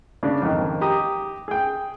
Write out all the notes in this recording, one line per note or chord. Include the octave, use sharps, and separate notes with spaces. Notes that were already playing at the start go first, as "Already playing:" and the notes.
C#3 D4
F2 G#2 D#3
G4 A#5 D#6
G#4 G5